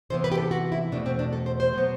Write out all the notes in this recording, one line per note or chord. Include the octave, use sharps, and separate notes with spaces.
C3 E3 B3 C5
B4
G4
A4
F#4
E4
E2 B2 A3 D4
C4
D4
A4
C5
C5
B2 F#3 B3